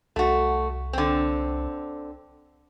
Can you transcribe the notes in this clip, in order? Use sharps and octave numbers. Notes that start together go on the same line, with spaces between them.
C2 A3 F#4
D3 C4